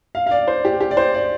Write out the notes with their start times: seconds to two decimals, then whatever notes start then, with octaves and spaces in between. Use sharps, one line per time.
0.15 F5
0.27 F5
0.31 D5
0.48 C5
0.65 G4
0.81 G4
0.91 D5
0.97 C5
1.14 D5